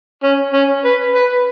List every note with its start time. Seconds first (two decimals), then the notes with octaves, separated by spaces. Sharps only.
0.23 C#4
0.53 C#4
0.84 B4
1.15 B4